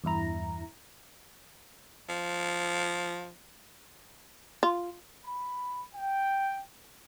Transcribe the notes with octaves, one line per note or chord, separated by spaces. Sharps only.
E2 G2 E4 A#5
F3
F4
B5
G5